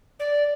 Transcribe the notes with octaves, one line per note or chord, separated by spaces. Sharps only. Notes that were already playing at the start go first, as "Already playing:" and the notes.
D5